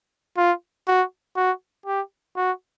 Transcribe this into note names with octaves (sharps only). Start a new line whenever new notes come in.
F4
F#4
F#4
G4
F#4